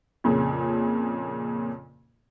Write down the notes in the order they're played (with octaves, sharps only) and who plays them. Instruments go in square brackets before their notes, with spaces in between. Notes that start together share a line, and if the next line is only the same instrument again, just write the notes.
[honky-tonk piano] F2 A#2 C#3